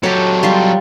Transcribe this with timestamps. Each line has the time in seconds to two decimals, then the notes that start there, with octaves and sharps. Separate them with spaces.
0.03 F#3 G4 A4 C#5
0.43 G3 F4 C6